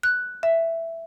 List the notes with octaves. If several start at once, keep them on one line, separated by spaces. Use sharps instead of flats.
F#6
E5